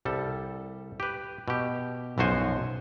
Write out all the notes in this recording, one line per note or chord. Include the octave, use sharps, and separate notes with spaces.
C2 G3 A4
G4 B4
B2 G4
B1 F#2 F3 F#4 C5 G#5